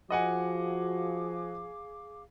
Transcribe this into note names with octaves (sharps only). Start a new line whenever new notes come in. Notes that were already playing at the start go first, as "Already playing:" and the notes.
F3 F#4 G#4 D#5 F5 F#5 G#5 D6